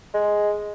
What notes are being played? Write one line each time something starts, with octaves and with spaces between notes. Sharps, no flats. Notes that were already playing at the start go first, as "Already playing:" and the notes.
G#3